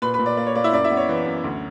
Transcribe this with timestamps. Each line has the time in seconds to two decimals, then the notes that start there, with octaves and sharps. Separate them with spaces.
0.02 A#2 B4 B5
0.14 B4 B5
0.19 A#2
0.26 D5
0.37 A#3 D5
0.46 C#5
0.55 A#3 D5
0.64 E4 E5
0.73 F#2 D5
0.84 E4 E5
0.91 B3
0.97 C#5
1.09 E3
1.26 F#2
1.44 D2